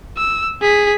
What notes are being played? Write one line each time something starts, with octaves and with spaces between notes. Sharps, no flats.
E6
G#4 B6